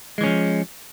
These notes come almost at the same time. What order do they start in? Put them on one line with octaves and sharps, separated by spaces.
G#3 E3 C#4 F3